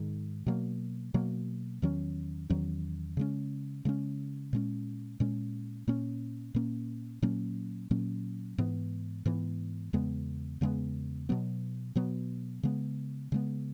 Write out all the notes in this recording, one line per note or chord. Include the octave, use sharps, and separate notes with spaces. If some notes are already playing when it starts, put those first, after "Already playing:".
Already playing: G#2 D#3 G#3
B2 F#3 A#3
B2 F#3 A#3
E2 D#3 F#3 C#4
E2 D#3 F#3 C#4
C#3 G#3 C#4
C#3 G#3 C#4
A#2 G#3 C#4
A#2 G#3 C#4
A#2 A#3 C#4
A#2 A#3 C#4
A#2 F#3 A#3 C#4
A#2 F#3 A#3 C#4
G#2 E3 B3
G#2 E3 B3
E2 C#3 G#3 B3
E2 C#3 G#3 B3
B2 F#3 B3
B2 F#3 B3
C#3 G#3 B3
C#3 G#3 B3